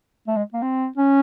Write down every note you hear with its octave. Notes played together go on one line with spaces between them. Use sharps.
A3
G#3
A#3
C4
C#4